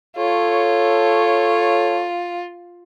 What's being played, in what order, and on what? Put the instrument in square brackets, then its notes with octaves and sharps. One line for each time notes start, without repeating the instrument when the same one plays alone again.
[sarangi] F4 [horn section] A4 C#5